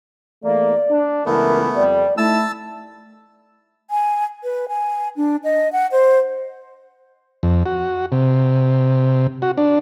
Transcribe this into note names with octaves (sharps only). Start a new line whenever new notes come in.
E2 A3 A#3 D5
D4
C#2 E3 A3 B3 A#4
F2 G3 D5
A3 D#4 E4 A5 E6
G#5
B4
G#5
D4
D#5
F#5
C5
F2
F#4
C3
F#4
D4